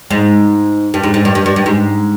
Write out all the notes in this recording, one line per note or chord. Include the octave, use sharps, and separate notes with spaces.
G#2
G2
G#2
G#2
G2
G2
G2
G2
G#2